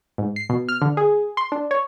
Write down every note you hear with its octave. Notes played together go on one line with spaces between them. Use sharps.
G#2
C7
B2
F6
D3
G#4
C6
D4
C#5